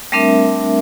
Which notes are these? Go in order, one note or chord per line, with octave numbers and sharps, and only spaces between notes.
G3 A3 C4 D4 A#4 E5